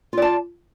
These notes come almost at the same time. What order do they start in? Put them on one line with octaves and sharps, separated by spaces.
F4 D5 A5